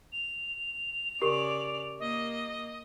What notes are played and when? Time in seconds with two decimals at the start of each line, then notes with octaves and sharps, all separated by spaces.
0.12 F7
1.22 C#3 G4 A#4 D5 C#6
2.00 A#3 D#5